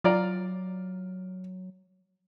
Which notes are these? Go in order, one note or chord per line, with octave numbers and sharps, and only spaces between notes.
F#3 F4 D5 A#5